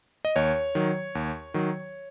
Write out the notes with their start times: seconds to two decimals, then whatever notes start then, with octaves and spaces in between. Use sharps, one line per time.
0.25 D#5
0.36 D#2 C#5
0.75 D#3 F#3
1.15 D#2
1.54 D#3 F#3